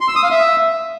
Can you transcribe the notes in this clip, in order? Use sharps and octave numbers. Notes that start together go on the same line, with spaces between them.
C6
E6
D#6
F5
E5